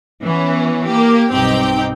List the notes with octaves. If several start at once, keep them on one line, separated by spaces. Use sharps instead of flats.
E3 B3 C#4
A#3 G4
B1 G2 C4 D#4 G4 G5